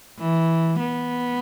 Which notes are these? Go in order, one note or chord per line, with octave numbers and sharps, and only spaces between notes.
E3
B3